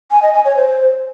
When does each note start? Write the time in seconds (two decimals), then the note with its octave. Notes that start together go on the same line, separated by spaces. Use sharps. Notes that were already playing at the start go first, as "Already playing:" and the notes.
0.11 G#5
0.22 D#5
0.34 G#5
0.45 C#5
0.56 C5